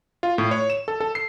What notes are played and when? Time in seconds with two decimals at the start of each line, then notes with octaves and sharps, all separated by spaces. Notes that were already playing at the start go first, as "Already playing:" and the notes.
0.23 F4
0.38 A2
0.51 C#5
0.70 E7
0.88 A4
1.00 A4
1.15 C7